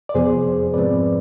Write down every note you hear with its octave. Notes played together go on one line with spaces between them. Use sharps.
D5
F2 C3 F3 B3 G#4 C5
G#2 F3 G#3 C4 B4 D5